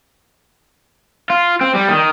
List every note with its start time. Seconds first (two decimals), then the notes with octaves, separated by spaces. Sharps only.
1.30 F4
1.61 C4
1.75 G3
1.89 D#3